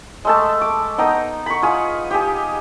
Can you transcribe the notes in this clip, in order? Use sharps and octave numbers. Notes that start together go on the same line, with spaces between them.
G#3 A3 A5
D6
B3 D#4 G5 A#5
B5 C#6
F4 G#4 F5
G4 G#4